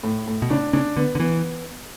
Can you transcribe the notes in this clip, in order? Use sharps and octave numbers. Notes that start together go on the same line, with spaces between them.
A2
A2
B2
C#3 D4
C#3 D4
D3 B3
D3
E3 B3